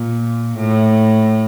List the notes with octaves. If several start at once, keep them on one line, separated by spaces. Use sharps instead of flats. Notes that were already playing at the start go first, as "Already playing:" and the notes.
Already playing: A#2
A2